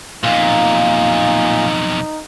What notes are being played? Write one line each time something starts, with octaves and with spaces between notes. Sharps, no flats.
B1 F2 A#2 D#4 F5